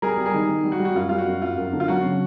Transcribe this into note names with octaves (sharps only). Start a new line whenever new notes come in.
G3 G#4 A#4
G3
G#4 A#4
D#3
D#3
G3
F#4
G3
F#4
F#2 F4
G3 F4
F#4
F#2
F#2 F4
F#2
D3
F4
F#3 F#4
C#3